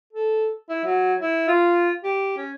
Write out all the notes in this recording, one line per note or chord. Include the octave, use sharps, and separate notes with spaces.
A4
E4
F#3
E4
F4
G4
C#4